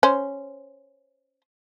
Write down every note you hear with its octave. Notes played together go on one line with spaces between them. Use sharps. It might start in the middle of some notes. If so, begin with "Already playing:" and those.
C#4 C5